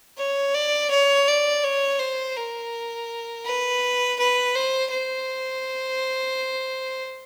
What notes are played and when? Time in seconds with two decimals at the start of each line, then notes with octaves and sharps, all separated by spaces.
0.18 C#5
0.55 D5
0.90 C#5
1.28 D5
1.64 C#5
1.99 C5
2.37 A#4
3.45 B4
4.19 B4
4.55 C5
4.91 C5